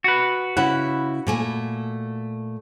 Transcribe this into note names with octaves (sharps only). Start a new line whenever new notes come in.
F#4 B4
C#3 E4 F#5
A#2 A3 G#5